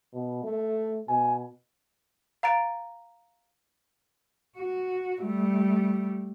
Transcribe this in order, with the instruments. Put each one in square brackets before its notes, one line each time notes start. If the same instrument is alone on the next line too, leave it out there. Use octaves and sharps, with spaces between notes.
[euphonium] B2
A3
[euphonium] B2 [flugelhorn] G#5
[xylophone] F5 A#5 A6 D7
[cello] F#4
G3 A3